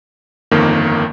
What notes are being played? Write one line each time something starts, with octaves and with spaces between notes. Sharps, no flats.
G1 F2 D#3 A#3